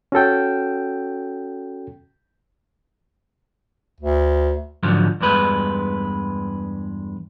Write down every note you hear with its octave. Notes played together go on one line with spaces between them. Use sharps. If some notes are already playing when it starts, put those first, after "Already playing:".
C#4 F#4 A4 G5
D2
G#2 D3 F3 F#3
E2 G2 G#3 B4